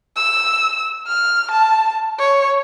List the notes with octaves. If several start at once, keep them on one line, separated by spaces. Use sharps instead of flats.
E6
F6
A5
C#5